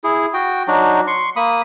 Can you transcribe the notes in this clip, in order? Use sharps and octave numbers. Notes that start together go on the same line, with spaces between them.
E4 G#4
F#4 G5
F#3 D4 D#4 F#4
C6 C#6
A#3 B5 D#6